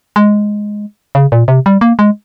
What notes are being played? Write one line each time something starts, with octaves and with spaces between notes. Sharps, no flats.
G#3
C#3
A#2
C3
G3
A#3
G#3